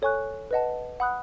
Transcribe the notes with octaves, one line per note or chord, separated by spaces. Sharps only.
A4 C#5 G#5 C#6 F#6
B4 D#5 F#5 A5
F#5 B5 D#6 F#6